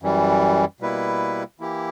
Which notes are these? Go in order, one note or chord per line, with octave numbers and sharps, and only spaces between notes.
F#2 E3 G3
B2 G3 A#3 E4 B4
E3 A#3 E4 G4